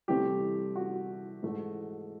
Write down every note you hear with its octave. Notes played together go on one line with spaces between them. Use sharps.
C2 C3 E3 A3 C4 G4
F#4
G#2 E3 A3